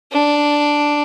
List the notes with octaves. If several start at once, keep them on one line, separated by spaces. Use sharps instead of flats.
D4